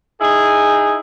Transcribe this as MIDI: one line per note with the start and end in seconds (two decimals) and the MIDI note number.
0.21 0.99 63
0.21 0.99 64
0.21 0.99 68